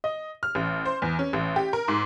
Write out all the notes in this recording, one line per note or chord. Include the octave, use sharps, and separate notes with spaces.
D#5
F6
A1
C5
E2
C#4
A1
G4
A#4
G#2